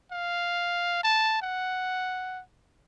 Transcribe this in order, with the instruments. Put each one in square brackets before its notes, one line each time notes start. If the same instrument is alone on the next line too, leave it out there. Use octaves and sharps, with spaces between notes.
[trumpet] F5
A5
F#5